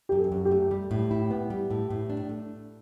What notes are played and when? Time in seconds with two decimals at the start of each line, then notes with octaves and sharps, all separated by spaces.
0.09 F#2 G4
0.19 A4
0.32 F#2
0.45 G4
0.51 A3
0.71 G3
0.91 A2
1.11 E4
1.31 B3
1.50 G3
1.70 A2
1.90 A2
2.10 D4
2.29 A3